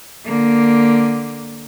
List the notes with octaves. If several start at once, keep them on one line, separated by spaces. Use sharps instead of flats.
D3 A#3